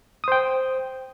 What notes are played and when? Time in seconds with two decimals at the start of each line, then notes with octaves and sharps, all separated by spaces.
0.24 D#6
0.28 C5
0.32 G5